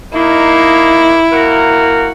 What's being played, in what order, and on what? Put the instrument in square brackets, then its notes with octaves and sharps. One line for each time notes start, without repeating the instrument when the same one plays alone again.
[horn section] A#3 D#4 [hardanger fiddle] E4
[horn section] A#3 F#4 A#4